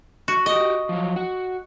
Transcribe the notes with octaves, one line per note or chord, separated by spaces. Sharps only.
F#4
F#4 G4 D#5
F3 F#3
F#4